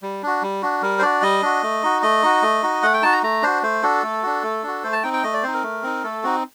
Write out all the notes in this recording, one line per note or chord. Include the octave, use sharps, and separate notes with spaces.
G3
D4 F#4
G3
D4 F#4
G3 A#4
C5
D4 F#4 D5
G3 D#5
D4 F#4
A3
D#4 F#4
A3 D#5
D#4 F#4
A3
D#4 F#4
A3 F#5
G5
D#4 F#4 A5
A#5
A3 A#5
D4 F#4 C5
A3 C5
D4 F#4 A4
A3
D4 F#4
A3
D4 F#4
A3 C5
A5
C4 D#4 G5
G5
A3 D#5
D5
C4 D#4 C5
A#4
A3
C4 D#4
A3 A4
C4 D#4 F#4